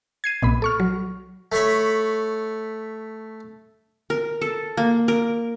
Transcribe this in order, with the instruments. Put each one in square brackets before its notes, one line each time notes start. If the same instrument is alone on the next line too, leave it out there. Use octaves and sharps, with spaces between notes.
[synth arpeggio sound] G#6 C7 D#7
B1 A#2 B5
A4 C#6 F6
F#3
[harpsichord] A3 C#5 B5
[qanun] A#4
A4
A#3
A#4